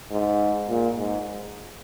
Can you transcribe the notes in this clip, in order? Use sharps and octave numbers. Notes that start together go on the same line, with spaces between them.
G#2
A#2
G#2